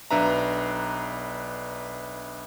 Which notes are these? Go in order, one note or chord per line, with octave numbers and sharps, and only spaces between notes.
B1 D4 B4 E5 A#5